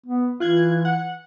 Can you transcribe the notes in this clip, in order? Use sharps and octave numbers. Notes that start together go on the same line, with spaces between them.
B3
E3 F4 F#6 G#6
F#5